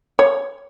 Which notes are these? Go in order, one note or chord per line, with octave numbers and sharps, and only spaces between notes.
C#5